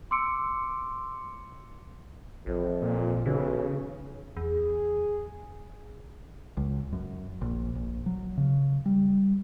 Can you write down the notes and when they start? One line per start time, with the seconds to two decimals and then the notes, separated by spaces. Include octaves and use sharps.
0.11 C6 D6 E6 C#7 D7
2.46 A1 F2
2.82 A#2
3.26 B1 C#3 E3
4.37 E2 G#4
6.57 C#2
6.93 F#2
7.41 A#1
7.75 A#1
8.06 F#3
8.37 C#3
8.86 G3